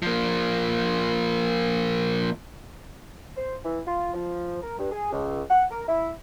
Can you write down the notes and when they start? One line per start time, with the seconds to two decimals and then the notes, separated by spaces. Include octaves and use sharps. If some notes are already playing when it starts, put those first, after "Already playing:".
0.02 F3 A#3
3.36 C5
3.64 E3
3.87 F4
4.14 F3
4.62 A#4
4.78 G2
4.91 G#4
5.12 C#2
5.49 F#5
5.71 A#4
5.88 E4